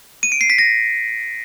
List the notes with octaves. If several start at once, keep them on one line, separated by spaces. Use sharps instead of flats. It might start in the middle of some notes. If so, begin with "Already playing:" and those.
D#7
D7
C7
B6
A#6